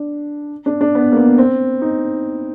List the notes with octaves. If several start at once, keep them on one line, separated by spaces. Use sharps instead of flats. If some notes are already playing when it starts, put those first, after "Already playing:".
Already playing: D4
D4
D4
B3
A#3
B3
C4
D#4